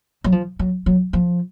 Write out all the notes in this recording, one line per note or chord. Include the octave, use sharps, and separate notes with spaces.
F#3
F3
F#3
F#3
F3